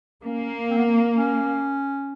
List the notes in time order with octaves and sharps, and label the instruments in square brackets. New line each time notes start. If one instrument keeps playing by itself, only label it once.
[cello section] A#3 [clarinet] C#4
[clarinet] C4
B3
C4
C#4